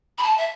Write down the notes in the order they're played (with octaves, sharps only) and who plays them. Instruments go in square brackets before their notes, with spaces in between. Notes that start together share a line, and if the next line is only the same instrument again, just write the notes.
[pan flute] B5
A5
E5